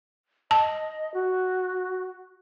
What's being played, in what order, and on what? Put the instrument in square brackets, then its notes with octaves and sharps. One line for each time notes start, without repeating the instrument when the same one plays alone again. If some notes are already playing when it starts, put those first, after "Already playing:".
[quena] D#5 [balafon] A5
[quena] F#4